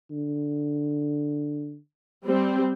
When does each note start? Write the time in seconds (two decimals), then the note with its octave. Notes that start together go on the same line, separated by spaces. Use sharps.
0.11 D3
2.26 G3 C4